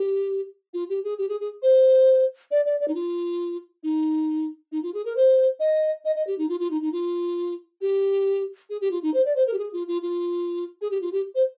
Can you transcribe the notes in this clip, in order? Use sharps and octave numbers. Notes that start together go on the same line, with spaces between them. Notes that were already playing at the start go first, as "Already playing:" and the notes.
Already playing: G4
F4
G4
G#4
G4
G#4
G#4
C5
D5
D5
D5
D#4
F4
D#4
D#4
F4
G#4
A#4
C5
D#5
D#5
D#5
G4
D#4
F4
F4
D#4
D#4
F4
G4
G#4
G4
F4
D#4
C5
D5
C5
A#4
G4
G#4
F4
F4
F4
G#4
G4
F4
G4
C5